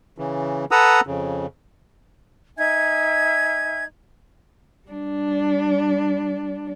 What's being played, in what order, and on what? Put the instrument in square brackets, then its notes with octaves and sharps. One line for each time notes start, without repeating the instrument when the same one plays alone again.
[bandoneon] C#3 E3
A4 B4 F#5 A#5 D#6 E6
F2 C#3
[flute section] D#4 E5 G#5 G#6
[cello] G3 D4